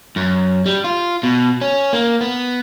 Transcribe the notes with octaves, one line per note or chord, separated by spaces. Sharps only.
F#2
G3
F4
B2
C#4
A#3
B3